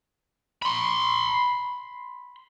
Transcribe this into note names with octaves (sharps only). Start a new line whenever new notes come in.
B5 C6